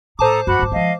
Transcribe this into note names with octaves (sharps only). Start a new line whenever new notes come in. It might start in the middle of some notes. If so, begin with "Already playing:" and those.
A2 A4 C5 A5 A#5 D6 D#6
F#2 F#4 F#5 B5
G#2 G3
F3 G#3 D#5 F5